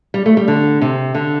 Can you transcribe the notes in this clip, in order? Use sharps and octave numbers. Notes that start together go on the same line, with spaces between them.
G3
A3
G3
D3
C3
D3